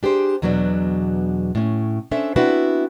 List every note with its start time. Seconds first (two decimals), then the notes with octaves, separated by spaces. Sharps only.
0.03 D4 G4 G#4 C5
0.42 E2 B2 F#3 B3 D4
1.55 A2 C#4
2.11 C#4 D4 A4 C5 E5
2.36 B3 C4 D4 E4 F#4 B4